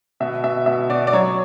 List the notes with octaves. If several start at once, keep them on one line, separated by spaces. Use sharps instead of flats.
B2 E5
B2 E5
B2 E5
B2 D5
D5
F#3 C#5